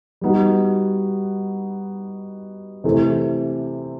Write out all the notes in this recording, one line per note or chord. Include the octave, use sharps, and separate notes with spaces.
G3 B3 D#4 F#4
C3 E3 A3 C4